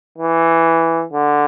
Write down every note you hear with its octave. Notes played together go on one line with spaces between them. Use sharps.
E3
D3